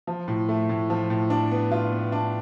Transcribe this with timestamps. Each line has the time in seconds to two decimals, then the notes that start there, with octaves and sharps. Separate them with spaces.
0.07 F3
0.28 A2
0.49 A3
0.69 A2
0.90 F3
1.10 A2
1.30 D4
1.52 B3
1.71 F4
1.92 B3
2.12 D4